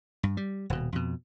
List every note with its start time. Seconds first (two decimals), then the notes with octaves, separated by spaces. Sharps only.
0.23 G2
0.37 G3
0.70 D#1 B2
0.93 F2 B2